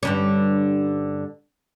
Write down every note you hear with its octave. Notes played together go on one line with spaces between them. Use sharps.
G2 D3 C#4